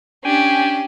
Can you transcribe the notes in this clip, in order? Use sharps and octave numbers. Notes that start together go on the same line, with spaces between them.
C#4 D4 G4 G5 G#5